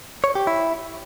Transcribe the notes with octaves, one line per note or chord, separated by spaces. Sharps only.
C#5
G4
E4